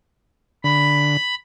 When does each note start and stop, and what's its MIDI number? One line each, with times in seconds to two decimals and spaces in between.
0.64 1.17 50
0.64 1.35 83